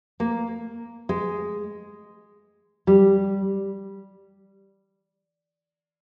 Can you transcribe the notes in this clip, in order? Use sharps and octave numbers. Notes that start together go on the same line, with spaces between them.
A#3
G#3
G3